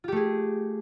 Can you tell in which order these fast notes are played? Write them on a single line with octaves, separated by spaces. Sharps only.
F4 G4 A3 G#4